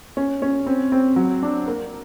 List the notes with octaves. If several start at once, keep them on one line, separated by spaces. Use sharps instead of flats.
C#4
C#4
C4
C4
F#3
D4
A#3